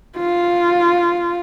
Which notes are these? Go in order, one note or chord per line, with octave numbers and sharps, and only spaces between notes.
F4